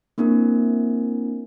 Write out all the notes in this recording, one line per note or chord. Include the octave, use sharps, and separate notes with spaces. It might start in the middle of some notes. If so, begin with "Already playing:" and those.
A#3 C4 D4 E4 A#4